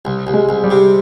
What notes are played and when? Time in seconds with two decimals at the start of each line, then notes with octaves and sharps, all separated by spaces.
0.05 C2
0.27 C2
0.34 G#3
0.49 C2
0.64 G3
0.70 C3